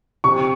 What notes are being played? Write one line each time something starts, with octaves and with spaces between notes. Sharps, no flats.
C3 C#6